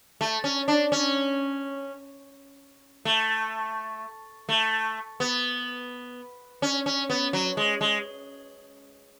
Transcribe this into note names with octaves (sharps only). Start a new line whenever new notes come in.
A3
C#4
D4
C#4
A3
A3
B3
C#4
C#4
B3
F#3
G#3
G#3